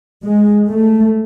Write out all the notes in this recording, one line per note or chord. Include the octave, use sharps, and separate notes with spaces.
G#3
A3